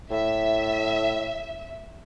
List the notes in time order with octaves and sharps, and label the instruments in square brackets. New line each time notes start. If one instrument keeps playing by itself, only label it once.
[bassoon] A2 [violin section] E5